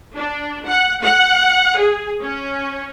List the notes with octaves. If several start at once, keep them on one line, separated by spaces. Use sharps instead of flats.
D4
F#5
F#5
G#4
C#4